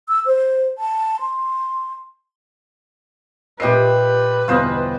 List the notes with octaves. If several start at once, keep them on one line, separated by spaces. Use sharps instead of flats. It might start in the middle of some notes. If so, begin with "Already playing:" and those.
E6
C5
A5
C6
A#2 G4 B4 D#5 E5 C7
G1 E2 B2 F4 C5 D#5